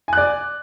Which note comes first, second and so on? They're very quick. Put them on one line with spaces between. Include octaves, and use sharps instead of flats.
G#5 F#6 D5